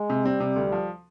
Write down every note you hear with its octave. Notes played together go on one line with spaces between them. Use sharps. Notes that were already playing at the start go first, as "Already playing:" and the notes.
Already playing: G#3
C3
G3 C4
C3
D2
F3